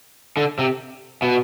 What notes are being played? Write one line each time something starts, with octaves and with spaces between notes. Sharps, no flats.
D3
C3
B2